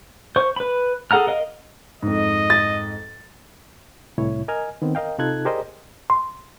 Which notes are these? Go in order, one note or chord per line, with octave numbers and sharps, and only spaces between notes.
C5 C#6
B4 B5
G#4 A4 F#5 A#5 F6
A#4 D#5 F5
F2 G#2 D#5
A6
C2 A2 E4 C#5
A#4 D#5 G#5 F6
D#3 B3 C4
A#4 D#5 F5 G5
C3 D#4 F4 A4 F#6 G#6
G4 G#4 A#4 C5 D5 D#5
C6